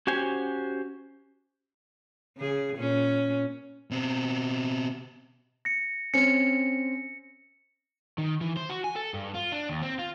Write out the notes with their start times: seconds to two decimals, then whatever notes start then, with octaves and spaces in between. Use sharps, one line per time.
0.07 C#4 F#4 G4 C5 G#5
2.37 C#3 G#4
2.77 A#2 C#4
3.91 B2 C4
5.65 A#6 C#7
6.14 C4 C#4 C#7
8.18 D#3
8.41 E3
8.57 C5
8.70 F#4
8.84 G#5
8.96 A4
9.14 G2
9.35 F4
9.52 D4
9.69 D#2
9.83 C4
9.99 F4